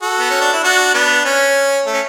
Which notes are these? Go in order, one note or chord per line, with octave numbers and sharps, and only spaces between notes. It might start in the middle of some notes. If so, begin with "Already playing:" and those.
F#4 A4
B3
C#4
D4
E4
D4 F#4
B3 D4
C#4
A3
C#4